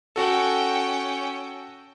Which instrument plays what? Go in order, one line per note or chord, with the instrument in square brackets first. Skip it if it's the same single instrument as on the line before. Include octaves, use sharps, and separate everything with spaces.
[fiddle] C#4 G5 [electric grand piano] F#4 A4